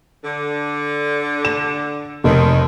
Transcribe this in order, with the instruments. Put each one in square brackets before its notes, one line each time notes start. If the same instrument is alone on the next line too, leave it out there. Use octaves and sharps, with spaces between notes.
[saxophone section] D3
[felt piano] E7
[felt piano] F1 [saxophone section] D#2 D#3